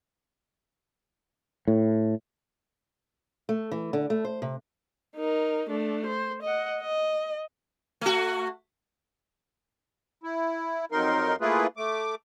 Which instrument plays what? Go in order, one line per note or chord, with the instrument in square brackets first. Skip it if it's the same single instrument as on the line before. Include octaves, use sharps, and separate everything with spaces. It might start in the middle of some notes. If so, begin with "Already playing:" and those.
[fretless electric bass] A2
[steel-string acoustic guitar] A3
E3
D3
A3
C5
C3
[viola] D#4 A#4
A3 D4
C5
D#5 F#5
D#5
[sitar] A3 F#4
[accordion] E4
F2 F#3 D#4 A#4 C6
A3 A#3 E4 F4 G#4 B4
A3 D6